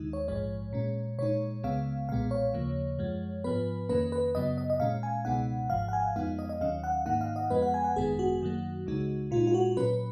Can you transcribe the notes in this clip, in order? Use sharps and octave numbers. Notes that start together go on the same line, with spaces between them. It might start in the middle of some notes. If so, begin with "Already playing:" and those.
Already playing: D#2 D#3 G#3 D#4
C#5
A#1 G#2 F3 G#3 C#5
A#2 G#3 C#4
A#2 G#3 D#4 C#5
C#2 C#3 G#3 B3 F5
B1 A#2 G#3 B3 F5
C#5
D#2 C#3 F3 A#3
F#2 F3 G#3
G#2 F3 B3 B4
F2 D#3 A#3 C#4 B4
B4
F#2 C#3 F#3 B3 D#5
D#5
D#5
A#2 G#3 C#4 F5
G#5
C#2 B2 G#3 B3 D#4 F#5
G#1 G#2 F3 F5
F#5
G#5
F2 F3 G#3 B3 D#4 F5
D#5
D#5
D#2 D#3 F#3 C#4 F5
F#5
G#2 D#3 A#3 D#4 F#5
F5
D#5
F2 F3 G#3 B3 B4
F#5
G#5
F#5
G#1 F#2 D#3 G#3 B3 G#4
F#4
F#2 D#3 F#3 A#3
C#2 C#3 G#3 D#4
A#2 G#3 D#4 F4
F4
F#4
A#2 F#3 C#4 B4